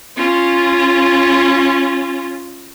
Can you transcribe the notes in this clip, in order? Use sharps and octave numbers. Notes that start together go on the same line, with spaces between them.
C#4 F4